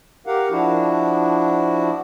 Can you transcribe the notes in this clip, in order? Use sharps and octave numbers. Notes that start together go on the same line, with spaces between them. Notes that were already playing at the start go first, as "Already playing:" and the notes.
G4 A#4 F5 F#5
F3 D4 E4 F#4